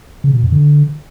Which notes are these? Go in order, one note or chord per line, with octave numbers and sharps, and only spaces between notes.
C#3
B2
F#2
D3